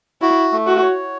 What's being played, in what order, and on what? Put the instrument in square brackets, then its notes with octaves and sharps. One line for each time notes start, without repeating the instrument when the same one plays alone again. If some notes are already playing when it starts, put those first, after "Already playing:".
[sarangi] E4 [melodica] F#4
[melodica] A3
[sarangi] F#4
[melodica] C#5